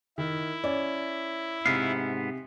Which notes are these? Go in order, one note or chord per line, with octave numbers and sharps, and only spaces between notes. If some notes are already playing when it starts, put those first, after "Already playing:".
D#3 E4
C#4 D5
G#2 C3 B3 F5